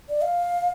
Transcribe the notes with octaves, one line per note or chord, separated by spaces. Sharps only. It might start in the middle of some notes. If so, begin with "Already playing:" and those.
D5
F5